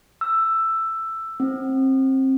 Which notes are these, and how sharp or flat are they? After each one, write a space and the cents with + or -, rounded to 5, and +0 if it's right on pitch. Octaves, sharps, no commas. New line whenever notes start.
E6 +10
C4 +25